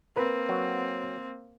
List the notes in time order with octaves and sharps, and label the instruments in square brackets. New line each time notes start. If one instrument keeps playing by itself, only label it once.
[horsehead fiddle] A#3 C4 [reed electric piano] A#4 B4
[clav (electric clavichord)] F#3